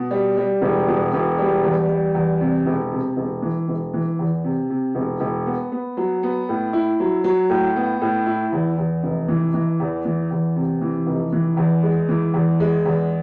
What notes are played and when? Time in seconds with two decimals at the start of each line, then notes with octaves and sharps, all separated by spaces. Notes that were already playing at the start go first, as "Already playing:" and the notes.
Already playing: B2
0.11 G3
0.37 G3
0.62 E1
0.88 B2
1.13 E1
1.38 G3
1.64 E2
1.89 G3
2.15 E2
2.41 C3
2.66 E1
2.92 C3
3.17 E1
3.42 E3
3.68 E1
3.93 E3
4.19 E2
4.44 C3
4.70 C3
4.95 E1
5.20 E1
5.46 B3
5.72 B3
5.97 F#3
6.23 B3
6.49 A2
6.73 E4
7.00 F#3
7.24 F#3
7.49 A2
7.76 B3
8.01 A2
8.26 E4
8.52 E2
8.78 E2
9.04 F1
9.28 E3
9.54 E3
9.80 E2
10.05 E3
10.31 E2
10.56 C3
10.81 E3
11.07 F1
11.32 E3
11.57 E2
11.83 G#3
12.09 E3
12.34 E2
12.60 G#3
12.86 E2